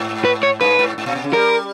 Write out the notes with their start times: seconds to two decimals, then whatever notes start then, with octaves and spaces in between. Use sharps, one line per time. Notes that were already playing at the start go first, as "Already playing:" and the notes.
Already playing: G#2
0.25 B4
0.43 C#5
0.61 G2 B4
0.79 G#2
0.98 G#2
1.06 A#2
1.15 B2
1.24 C#3
1.33 G3 A#4